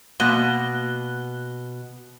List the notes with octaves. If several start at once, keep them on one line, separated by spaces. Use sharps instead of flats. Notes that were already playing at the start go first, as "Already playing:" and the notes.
B2 A#3 F#6 G7